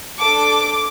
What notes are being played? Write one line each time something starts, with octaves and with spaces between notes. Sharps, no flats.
D4 A4 D6